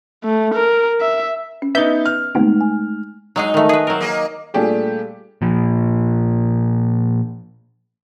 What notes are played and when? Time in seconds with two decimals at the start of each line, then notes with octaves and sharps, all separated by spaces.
0.24 A3
0.54 A#4
1.01 E5
1.62 C#4
1.75 B3 D#4 E5 G6
2.06 F6
2.35 G#1 C3 G#3 A3 B3 D#4
2.61 G#5
3.36 F#3 G#3 D#4 G#4
3.54 D#3 A3
3.69 G#4 B4
3.87 F#3 C4 A#4
4.00 A#3 G#4 D#5
4.54 A#2 G3 A3 D4 G4 G#4
5.42 A#2 F3